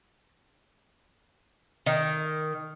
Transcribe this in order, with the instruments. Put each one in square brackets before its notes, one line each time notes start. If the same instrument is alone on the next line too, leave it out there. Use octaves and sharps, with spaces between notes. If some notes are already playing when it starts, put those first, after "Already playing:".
[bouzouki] D#3